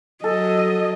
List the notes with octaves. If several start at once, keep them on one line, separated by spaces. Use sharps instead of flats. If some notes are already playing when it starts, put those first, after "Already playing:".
F#3 A4 D#5